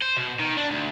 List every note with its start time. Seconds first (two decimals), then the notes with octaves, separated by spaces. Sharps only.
0.02 C5
0.17 B2
0.39 D#3
0.57 D4
0.70 D2